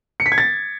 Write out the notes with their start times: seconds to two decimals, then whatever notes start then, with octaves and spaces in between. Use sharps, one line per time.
0.20 C#7
0.26 B6
0.32 G#6
0.38 A6